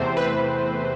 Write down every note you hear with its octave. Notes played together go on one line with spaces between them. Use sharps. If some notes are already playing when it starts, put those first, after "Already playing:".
Already playing: E2 C3 E3 A3 C4 C5
B4